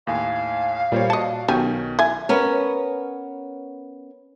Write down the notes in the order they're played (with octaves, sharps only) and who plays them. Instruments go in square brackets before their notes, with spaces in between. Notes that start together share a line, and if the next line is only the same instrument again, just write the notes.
[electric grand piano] D#2 A2 G#5 [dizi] F5
[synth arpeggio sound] A#2 [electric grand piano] G3 C5 C#5
[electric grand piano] F#4 D5 C#7 [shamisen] D#5 A5
[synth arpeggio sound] B1 C#4 G#5 [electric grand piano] B2 D#3 [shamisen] G4
[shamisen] E4 G#5
[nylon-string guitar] B3 C#4 A#4